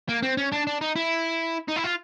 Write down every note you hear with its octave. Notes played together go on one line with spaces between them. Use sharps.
A#3
C4
C#4
D4
D4
D#4
E4
D#4
E4
F4